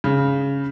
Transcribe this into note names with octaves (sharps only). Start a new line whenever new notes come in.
C#3